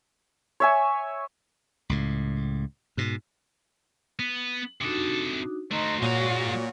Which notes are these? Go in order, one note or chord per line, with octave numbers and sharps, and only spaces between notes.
C#5 E5 G#5
C#2 A2
G#2 B2
B3
C3 D4 D#4 F#4 A4
A3 D#4 F#4 C5
A#2 G#3 F#4 C#5 A#5